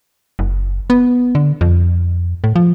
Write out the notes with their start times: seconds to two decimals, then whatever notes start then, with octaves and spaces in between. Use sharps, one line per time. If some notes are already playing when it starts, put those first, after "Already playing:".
0.39 F#1
0.90 B3
1.35 D3
1.61 F2
2.44 A2
2.56 F3